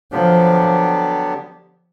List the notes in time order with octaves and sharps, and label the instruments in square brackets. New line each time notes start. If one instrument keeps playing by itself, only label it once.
[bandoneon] D3 F#3 B3 D4 G4 [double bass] F3